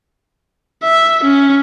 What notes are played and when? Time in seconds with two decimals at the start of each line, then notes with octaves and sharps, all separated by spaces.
0.83 E5
1.24 C#4